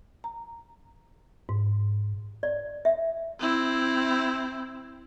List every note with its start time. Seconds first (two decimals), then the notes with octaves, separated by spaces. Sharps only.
0.24 A#5
1.49 G#2
2.43 D5
2.85 E5
3.39 C4 E4